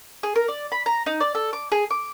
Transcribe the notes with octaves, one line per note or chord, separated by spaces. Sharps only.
G#4
A#4
D5
B5
A#5
D#4
D5
A4
D6
G#4
D6